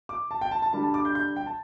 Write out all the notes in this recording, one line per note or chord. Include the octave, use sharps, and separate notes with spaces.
D6
A5
G5
A5
A5
D3 G3 D4 A5
A5
D6
G6
G6
G5
A5